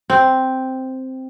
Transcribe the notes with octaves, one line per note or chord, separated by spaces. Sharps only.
C4